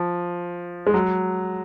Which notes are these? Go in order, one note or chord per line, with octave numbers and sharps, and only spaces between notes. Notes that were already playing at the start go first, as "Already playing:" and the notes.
Already playing: F3
G#3
F#3